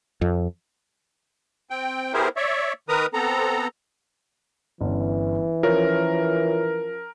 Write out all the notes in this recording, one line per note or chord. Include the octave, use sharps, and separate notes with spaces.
F2
C4 G5
B3 E4 G4 G#4 A#4 C5
C#5 D5 E5
D#3 A#4 B4 A#5 D#6
B3 C4 A4 A#5
G1 E3 C#4
F3 C#4 F4 A#4 C#5